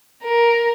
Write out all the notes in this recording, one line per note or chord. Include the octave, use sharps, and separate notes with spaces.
A#4